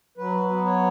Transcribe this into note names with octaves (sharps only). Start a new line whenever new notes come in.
F#3 B4
B3
C#5